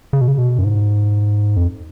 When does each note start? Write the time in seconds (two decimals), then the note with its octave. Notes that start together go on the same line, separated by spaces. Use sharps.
0.13 C#3
0.21 B2
0.28 C#3
0.38 B2
0.59 F#2
0.64 G#2
1.57 F2